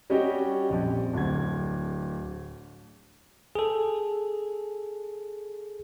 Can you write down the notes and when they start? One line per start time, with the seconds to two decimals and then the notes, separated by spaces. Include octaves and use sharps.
0.10 G3 C#4 F#4 G4 D#5 G5
0.70 A#1 F2
1.13 D1 D3 G#6
3.55 G#4 A4